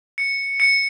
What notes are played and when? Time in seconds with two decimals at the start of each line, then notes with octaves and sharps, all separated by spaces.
0.18 C#7
0.60 C#7